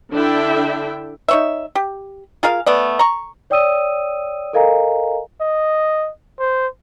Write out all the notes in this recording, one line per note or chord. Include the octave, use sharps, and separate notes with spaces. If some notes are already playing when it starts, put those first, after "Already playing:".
D3 D4 E4 E5 G5
D#4 C#5 E5
G4
F4 G#4 A#4 F5
A3 B3 D5
A#5 C#6
C#5 D5 G5 D#6 E6 D#7
A4 A#4 D#5 F5 G#5 A#5
D#5
C5